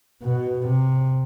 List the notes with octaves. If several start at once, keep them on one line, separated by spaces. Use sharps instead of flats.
B2
C3